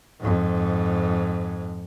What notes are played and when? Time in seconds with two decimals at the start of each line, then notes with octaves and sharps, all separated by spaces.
0.20 F2 G#2